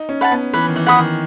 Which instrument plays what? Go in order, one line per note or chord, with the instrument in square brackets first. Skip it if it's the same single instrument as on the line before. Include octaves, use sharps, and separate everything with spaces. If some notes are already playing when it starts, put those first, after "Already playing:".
Already playing: [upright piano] D#4
C#4
[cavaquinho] B4 F#5 A5
[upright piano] B3
[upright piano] E3 [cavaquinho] B4
[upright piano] D#3
E3
[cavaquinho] F#5 B5 D#6
[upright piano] D#3